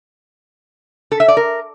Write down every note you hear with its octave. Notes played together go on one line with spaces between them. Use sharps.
A4
E5
D5
A#4